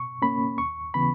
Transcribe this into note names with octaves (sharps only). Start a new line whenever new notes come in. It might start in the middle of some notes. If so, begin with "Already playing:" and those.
Already playing: B2 C#6
A#3 C#4 B5
D#2 C#6
C#3 E3 B3 B5